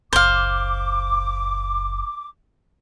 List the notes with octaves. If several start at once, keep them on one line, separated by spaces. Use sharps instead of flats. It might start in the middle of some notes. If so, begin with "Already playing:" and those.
F#1 C#2 C5 F5 D6